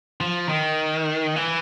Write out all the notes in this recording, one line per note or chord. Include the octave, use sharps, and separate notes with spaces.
F3
D#3
E3